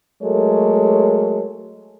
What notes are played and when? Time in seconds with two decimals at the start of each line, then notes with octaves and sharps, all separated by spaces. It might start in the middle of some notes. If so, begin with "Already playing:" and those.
0.23 F#3 G#3 A3 A4 A#4 C#5